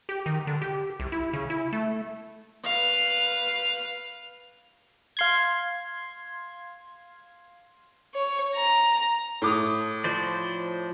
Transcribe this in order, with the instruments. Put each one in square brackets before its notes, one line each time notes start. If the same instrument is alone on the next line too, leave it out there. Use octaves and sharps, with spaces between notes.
[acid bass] G4
D#3
D3
G4
C2
E4
C#3
E4
A3
[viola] B4 F5
[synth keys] F5 C6 G#6
[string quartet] C#5
A#5
[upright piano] A2 D6 D#6
[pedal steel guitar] F3 C5 D5